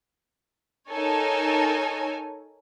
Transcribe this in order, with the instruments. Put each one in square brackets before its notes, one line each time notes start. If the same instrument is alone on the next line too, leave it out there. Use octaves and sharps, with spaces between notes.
[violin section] D#4 A4 A#4 C#5 G#5